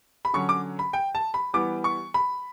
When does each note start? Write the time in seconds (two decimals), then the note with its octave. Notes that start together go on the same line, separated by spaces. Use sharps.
0.25 B5
0.33 D3 F#3 C#4 C#6
0.49 D6
0.79 B5
0.93 G5
1.15 A5
1.34 B5
1.53 E3 G3 B3 D6
1.84 C#6
2.14 B5